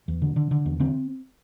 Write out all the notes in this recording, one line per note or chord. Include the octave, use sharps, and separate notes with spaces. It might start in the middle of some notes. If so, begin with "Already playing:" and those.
E2
D3
D3
D3
E2
D3 C4